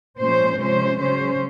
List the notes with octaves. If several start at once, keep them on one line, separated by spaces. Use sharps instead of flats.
A#2 F3 G#3 C#4 C5
C3 F3 G#3 C#4 C5
C#3 F#3 C#4 C5